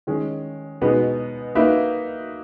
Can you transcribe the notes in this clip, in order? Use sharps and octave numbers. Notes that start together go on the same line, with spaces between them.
D#3 G#3 C#4
B2 G#3 B3 D#4 F#4
A#3 D#4 F#4 B4 E5